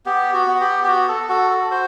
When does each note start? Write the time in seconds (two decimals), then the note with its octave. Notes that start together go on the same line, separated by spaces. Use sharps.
0.06 B3 G4
0.34 F#4
0.47 B3
0.61 G4
0.84 G4
0.88 F#4
1.08 A4
1.29 F#4 A4
1.50 A4
1.71 F#4 C5